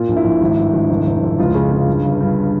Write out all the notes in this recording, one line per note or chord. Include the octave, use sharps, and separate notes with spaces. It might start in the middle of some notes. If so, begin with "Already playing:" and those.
Already playing: A#2 F4
A#1
E4
A#1
G#1
G2
G#1
F1
F1
F2
C#2 F4
C#3
C#3
G2
G1
G2